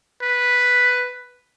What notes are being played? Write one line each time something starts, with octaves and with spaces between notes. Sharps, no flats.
B4